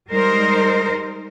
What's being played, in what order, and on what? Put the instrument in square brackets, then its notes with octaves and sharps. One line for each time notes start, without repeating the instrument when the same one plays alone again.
[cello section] G3 G#3 D#4 A#4 C5